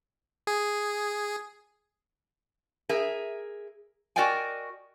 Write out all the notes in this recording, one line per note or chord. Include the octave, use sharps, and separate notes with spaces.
G#4
G#4 A#4 E5
F#4 A#4 D5 D#5 G5 G#5